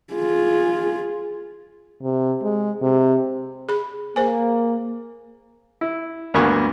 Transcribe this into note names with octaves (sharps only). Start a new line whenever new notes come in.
F4 G#4
C3
G#3
C3
G#4 B5
A#3 G#4 C5 G#5
E4
D2 G2 A#3 B3 G#5 C#6